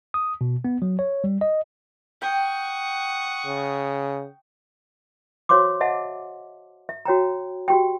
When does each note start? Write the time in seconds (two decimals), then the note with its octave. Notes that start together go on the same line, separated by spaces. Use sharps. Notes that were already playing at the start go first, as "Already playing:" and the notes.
0.14 D#6
0.41 B2
0.65 B3
0.82 F#3
0.99 C#5
1.24 G3
1.41 D#5
2.22 F#5 G5 C#6 D#6
3.46 C#3
5.49 F#4 C5 C#5 F5 C6 D6
5.80 G#4 D#5 E5 F#5 A5
6.89 E5
7.05 F#4 C#5 G5 A#5
7.68 F#4 G4 G5